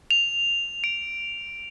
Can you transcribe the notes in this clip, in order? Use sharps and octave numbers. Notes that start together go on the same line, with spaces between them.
F7
D7